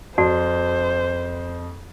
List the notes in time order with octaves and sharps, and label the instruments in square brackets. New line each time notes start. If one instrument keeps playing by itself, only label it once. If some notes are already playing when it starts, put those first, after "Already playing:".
[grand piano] F2 [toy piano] F#4 D5 A5 [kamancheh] C5